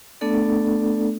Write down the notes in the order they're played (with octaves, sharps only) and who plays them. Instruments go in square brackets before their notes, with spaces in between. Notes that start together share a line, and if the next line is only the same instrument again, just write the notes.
[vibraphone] A3 B3 D4 A4 D5